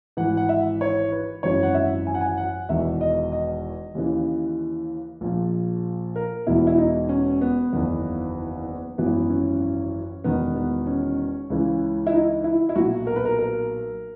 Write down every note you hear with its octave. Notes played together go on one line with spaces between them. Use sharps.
G#1 G#2 E3 F#5
F#5
E5
C#5
B4
G#1 F#2 C#3 E3 C#5
F#5
E5
G#5
F#5
G#5
F#5
E1 E2 D#3 E5
D#5
D#5
D#2 C#3 E3
A#1 A#2
A#4
E1 E2 B2 E4
E4
D#4
C#4
B3
F#1 E2 D#3 B3
G#1 F#2 E3 B3
C#4
E1 E2 D#3 B3
B3
C#4
C#2 C#3 E3
E4
D#4
E4
E4
B1 A#2 F#4
A#4
B4
A#4
A#4